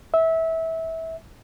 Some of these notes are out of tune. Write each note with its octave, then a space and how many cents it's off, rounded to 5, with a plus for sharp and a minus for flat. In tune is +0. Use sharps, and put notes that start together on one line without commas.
E5 -20